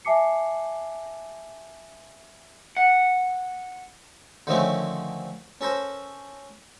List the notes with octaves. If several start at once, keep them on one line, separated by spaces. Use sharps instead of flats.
E5 G#5 A5 D6 C7 C#7
F#5
D3 D#3 F3 A3 C4 C#4
C#4 A4 A#4 C5